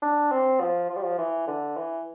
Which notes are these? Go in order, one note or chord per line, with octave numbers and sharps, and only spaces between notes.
D4
C4
F3
F3
G3
F3
E3
D3
E3